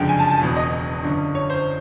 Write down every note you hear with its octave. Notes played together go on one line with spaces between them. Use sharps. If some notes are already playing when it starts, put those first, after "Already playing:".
Already playing: F#1 F2 D3 F3 G#3 G5
G#5
A5
A5
E1 E2 B2
D#5
G1 F#2 D3
C#5
C5